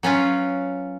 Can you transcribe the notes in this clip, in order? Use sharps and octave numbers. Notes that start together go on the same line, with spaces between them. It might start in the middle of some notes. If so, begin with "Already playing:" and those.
F#3 C#4 F4 B4